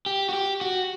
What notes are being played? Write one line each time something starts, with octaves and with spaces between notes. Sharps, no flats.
G4
F#4
G4
F#4